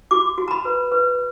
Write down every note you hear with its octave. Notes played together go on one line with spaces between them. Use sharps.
F#4 D6
F#4
A#5
B5
B4
B4